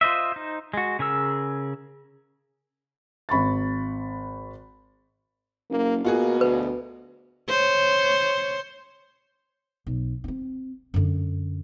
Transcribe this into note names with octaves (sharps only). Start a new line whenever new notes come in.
F4 C5 D#5 E5
D#4 C5
G#3 F#4
C#3 G#4 A#4 E6
G#1 B5 C#6 A6
F#1 A#3
B2 A#3 F4 F#4 G#4
D2 B4
C5 C#5
B1
C4 C#4
F#2 D3